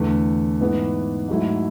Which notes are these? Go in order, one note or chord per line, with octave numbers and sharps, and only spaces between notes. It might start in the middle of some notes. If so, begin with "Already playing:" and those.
Already playing: E2 D3 A3
G#2 E3 B3
G#2 F#3 A3 E4